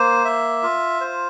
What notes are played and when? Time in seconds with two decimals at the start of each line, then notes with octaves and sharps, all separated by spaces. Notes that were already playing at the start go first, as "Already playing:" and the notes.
Already playing: A#3 C5
0.25 E5
0.63 F4
1.01 C5